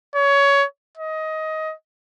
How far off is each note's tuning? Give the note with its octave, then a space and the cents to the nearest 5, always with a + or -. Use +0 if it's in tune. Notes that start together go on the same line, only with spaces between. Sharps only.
C#5 +20
D#5 +20